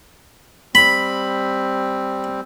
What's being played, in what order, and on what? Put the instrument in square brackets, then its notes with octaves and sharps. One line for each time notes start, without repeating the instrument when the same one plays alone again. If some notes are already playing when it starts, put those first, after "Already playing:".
[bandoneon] G3 C4 [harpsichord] B5